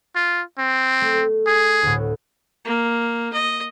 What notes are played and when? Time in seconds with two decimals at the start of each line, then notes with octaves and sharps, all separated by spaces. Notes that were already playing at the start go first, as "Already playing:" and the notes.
0.15 F4
0.59 C4
1.01 A3
1.47 G#4
1.83 D2 A2
2.65 A#3
3.33 D#5